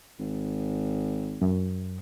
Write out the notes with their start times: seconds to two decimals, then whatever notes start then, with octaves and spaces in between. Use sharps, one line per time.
0.19 G#1
1.42 F#2